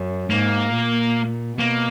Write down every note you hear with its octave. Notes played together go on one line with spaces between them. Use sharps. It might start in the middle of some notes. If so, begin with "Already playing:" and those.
Already playing: F#2
G#2 A#3
A#2
B2 A#3